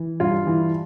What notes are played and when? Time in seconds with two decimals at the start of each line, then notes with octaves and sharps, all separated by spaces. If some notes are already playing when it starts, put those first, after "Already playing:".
Already playing: E3
0.20 G2 F4
0.47 E3